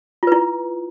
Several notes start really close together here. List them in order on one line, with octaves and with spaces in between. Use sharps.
F4 B4 E4